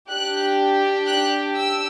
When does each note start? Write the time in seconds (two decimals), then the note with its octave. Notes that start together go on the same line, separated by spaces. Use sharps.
0.11 D4 G4 F#6
1.07 F#6
1.55 E6